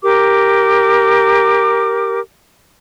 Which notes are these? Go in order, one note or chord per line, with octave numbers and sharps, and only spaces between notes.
G4 A#4 D6